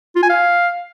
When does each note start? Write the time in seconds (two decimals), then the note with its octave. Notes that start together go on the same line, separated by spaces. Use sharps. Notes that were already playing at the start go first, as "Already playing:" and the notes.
0.16 F4
0.23 G#5
0.30 F5